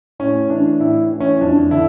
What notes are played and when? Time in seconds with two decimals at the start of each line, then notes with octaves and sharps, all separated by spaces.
0.19 A2 C#4
0.50 E3 D4
0.80 A2 E4
1.10 E3
1.20 C#4
1.41 F2 D4
1.71 D3 E4